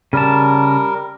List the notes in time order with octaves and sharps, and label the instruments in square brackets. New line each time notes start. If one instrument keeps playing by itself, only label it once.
[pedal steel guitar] C#3 A5 [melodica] G3 A#4